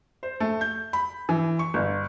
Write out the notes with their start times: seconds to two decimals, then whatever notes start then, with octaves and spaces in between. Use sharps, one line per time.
0.23 C5
0.40 A3
0.61 G6
0.93 B5
1.29 E3
1.59 C#6
1.74 G1